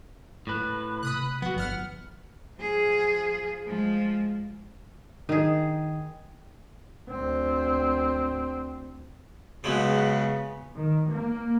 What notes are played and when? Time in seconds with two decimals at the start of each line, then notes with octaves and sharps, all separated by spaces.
0.47 A2 B4
1.03 C3 B5 D#6 F#6
1.42 F3 B3 F#4 F#5
1.56 G1 F#5 F6
2.58 F3 G#4
3.66 F3 G#3
5.29 D#3 G#4
7.10 D2 C4
9.64 C#3 F3 F#3 G#3 B3
10.76 D#3
11.08 A#3